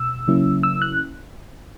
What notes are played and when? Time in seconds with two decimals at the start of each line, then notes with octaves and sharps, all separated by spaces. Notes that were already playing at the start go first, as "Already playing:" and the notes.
Already playing: B2 E6
0.28 C#3 F#3 A#3 C#4 E4
0.63 E6
0.82 F#6